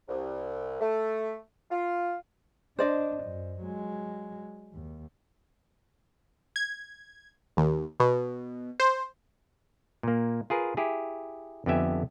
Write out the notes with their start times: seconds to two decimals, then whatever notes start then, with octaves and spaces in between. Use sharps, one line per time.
0.08 C2
0.81 A3
1.71 F4
2.79 D4 C5 D5 D#5
3.24 F#2
3.61 F#3 G#3
4.74 D#2
6.56 G#6
7.57 D#2
8.00 B2
8.80 C5
10.03 A#2 A#3
10.50 F4 G#4 A#4 B4
10.77 E4 G4 G#4
11.66 F2 D3 B3 G4 E5 G#5